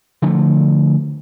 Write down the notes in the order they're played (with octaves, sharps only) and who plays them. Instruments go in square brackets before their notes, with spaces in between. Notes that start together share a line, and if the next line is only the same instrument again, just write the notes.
[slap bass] D3 F3 A3